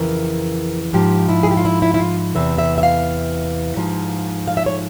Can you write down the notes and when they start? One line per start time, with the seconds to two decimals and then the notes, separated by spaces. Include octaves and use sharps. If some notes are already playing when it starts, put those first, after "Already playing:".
Already playing: F2 C#3 E3 A#4
0.93 G#2 F3 G4
1.29 E4
1.43 G#4
1.51 G4
1.57 F4
1.65 E4
1.82 E4
1.94 E4
1.99 F4
2.35 E2 C3 E3 E5
2.58 E5
2.78 E5
2.83 F5
3.77 G#2 F3
4.48 F5
4.57 E5
4.66 C#5